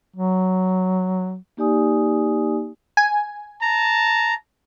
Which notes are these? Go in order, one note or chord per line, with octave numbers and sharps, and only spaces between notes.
F#3
A#3 D#4 G4 D5 G#5 D#6
G#5
A5 A#5